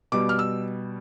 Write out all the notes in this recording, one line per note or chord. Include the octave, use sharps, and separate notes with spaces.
B2 G3 D6
F6
E6